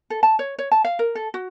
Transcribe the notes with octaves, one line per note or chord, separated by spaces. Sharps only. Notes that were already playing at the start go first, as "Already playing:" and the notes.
A4
A5
C#5
C#5
A5
F5
A#4
A4
F#4